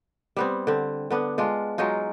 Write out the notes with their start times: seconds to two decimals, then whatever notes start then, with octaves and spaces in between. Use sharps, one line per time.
0.37 G3 B3 C4
0.67 D3 C4
1.10 D3 B3 D4
1.38 G#3 D4 F4
1.78 F#3 G#3 D#4 F4